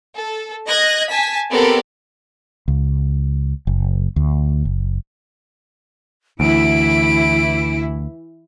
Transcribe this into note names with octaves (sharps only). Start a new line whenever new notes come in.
A4
D#5 F#6 G#6 A#6
G#5 A5 B6
B3 C4 G4 A4 A#4 D5
C#2
F#1
D2
F#1
D2 E3 E4 D7